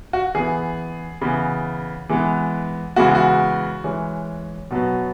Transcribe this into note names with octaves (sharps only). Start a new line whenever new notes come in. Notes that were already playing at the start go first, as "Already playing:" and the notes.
F#4
E3 B3 G#4
C#3 E3 B3
E3 G#3 B3
C#3 E3 G#3 B3 F#4
F#4
E3 G#3 C#4
B2 F#3 B3